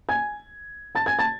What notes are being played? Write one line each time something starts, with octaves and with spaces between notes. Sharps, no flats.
G#5 G#6
A5 A6
G#5 G#6
A5 A6